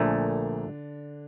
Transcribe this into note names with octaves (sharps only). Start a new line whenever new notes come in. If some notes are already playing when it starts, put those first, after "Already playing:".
Already playing: A#1 A#2 D3 A3 D4